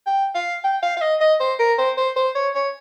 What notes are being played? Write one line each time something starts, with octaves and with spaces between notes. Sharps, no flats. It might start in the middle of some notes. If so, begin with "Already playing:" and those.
G5
F5
G5
F5
F5
D#5
D#5
C5
A#4
C5
C5
C5
C#5
C#5